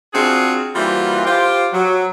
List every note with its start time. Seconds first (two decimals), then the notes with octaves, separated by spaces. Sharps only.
0.14 C4 D4 F4 F#4 G#4
0.75 E3 G3 A#3 F4 F#4 C5
1.25 F4 G4 C5
1.73 F#3